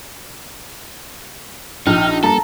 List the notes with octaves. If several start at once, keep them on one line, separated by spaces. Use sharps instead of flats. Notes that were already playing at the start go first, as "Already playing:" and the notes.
A#1 D#4 G5 F6
G3 A#3 A4 A5 A#5